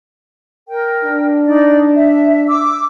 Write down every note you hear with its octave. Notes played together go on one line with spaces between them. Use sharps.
A#4 G5
D4
D#4 D5
E5
D6 E6